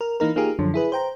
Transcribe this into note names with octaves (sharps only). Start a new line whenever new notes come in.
A#4
E3 A#3 D#4 A#4
A#3 D#4 F4 G4 G#4 A#4
F#2 D3 F3
E4 G#4 B4
C5 G5 A#5